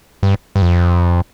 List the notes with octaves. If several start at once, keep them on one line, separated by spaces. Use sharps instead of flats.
G2
G2
F2